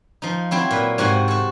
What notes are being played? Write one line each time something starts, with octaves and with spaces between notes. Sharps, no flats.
F3 D#4
F#3 C4 E4
A#2 B4
G#2 C3 C4 F#4 F#5 G#5
F#4 A4